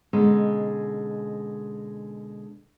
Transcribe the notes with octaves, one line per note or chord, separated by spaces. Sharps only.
B2 D3 G#3 C#4 D#4